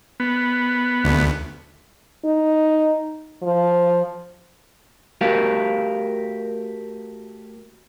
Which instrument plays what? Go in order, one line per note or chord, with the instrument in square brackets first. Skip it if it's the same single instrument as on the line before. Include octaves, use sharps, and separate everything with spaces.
[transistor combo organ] B3
[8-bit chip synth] D2
[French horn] D#4
F3
[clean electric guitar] A3 F#4 G4 A#4 F5